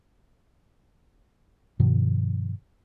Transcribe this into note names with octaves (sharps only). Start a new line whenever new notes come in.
G2 B2 D#3 F3